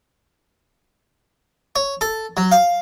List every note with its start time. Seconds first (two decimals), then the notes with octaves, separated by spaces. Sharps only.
1.76 C#5
2.01 A4
2.37 F#3
2.52 F5